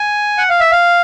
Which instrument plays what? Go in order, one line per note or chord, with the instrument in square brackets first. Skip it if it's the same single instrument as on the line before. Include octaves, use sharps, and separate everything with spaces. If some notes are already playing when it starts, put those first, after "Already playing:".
Already playing: [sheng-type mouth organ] G#5
F#5
F5
E5
F5